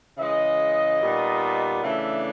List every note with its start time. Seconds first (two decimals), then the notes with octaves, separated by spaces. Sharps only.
0.18 C#3 E3 G#3 D#5
1.01 A#2 G3 B3 D#4
1.83 C#3 E3 A3 D4 E5